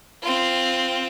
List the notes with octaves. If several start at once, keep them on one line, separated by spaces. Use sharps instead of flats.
C4 F4